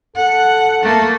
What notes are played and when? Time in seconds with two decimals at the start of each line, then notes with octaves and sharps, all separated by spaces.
0.16 A4 F#5
0.83 A3 A#3